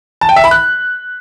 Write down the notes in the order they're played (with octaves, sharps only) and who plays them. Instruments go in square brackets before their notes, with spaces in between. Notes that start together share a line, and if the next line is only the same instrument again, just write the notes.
[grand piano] A5
G5
E5
B5
F#6